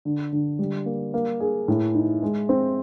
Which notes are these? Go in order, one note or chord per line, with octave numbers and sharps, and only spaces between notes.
D3
D3
G3
A#3
A#3
G#4
A2
D#4
G#3
C4